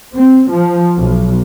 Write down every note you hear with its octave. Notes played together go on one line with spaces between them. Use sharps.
C4
F3
B1